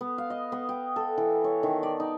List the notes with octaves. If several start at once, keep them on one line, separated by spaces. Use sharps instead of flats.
B3
F5
D#5
B3
G5
A4
E3
C#5
D#3
D5
D#4